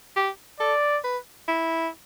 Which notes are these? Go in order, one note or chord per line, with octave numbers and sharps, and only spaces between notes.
G4
A4 D5
B4
E4